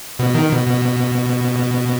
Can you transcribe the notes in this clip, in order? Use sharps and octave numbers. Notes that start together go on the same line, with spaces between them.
B2
D#3
B2
B2